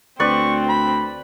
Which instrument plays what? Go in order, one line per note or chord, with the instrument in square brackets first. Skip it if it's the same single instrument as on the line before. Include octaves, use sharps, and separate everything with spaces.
[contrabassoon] D2 [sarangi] C4 [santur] B4 D5 [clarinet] C#6
[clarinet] B5